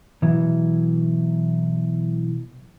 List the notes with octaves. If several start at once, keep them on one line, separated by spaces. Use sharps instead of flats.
B2 E3 F#3